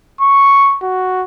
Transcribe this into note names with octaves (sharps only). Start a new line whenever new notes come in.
C#6
F#4